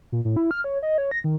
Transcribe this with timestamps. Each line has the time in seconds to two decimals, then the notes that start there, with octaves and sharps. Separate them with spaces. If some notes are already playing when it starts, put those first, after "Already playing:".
0.12 A#2
0.25 A2
0.36 E4
0.51 F6
0.64 C#5
0.83 D#5
0.98 C#5
1.11 A#6
1.24 D#3